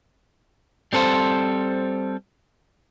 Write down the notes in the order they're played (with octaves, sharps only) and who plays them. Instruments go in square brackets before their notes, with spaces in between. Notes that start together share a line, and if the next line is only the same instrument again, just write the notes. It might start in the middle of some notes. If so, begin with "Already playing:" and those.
[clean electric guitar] G3 C4 A4 C5